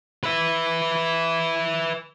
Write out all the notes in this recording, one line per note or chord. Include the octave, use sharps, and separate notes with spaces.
B4 E5